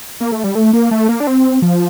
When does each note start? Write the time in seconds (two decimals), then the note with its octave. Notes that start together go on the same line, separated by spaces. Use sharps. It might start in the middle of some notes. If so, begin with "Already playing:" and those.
0.20 A#3
0.32 A3
0.44 G3
0.55 A3
0.73 A#3
0.91 A3
1.09 A#3
1.20 D4
1.27 C4
1.62 F3